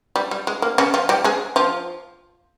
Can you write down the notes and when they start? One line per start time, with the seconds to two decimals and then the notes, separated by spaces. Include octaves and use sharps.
0.16 G3
0.31 G3
0.47 G#3
0.62 A#3
0.78 C#3 C#4
0.94 F3 F4
1.09 G3 G4
1.24 G#3 G#4
1.56 F3 F4